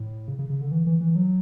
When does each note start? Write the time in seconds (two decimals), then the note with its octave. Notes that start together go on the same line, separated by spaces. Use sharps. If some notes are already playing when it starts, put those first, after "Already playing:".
Already playing: A2
0.28 C#3
0.39 C#3
0.49 C#3
0.61 D3
0.72 E3
0.86 E3
1.01 E3
1.16 F#3